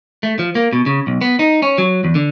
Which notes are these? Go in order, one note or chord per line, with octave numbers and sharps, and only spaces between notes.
A3
F3
A#3
B2
C#3
B1
B3
D#4
C#4
F#3
E2
D3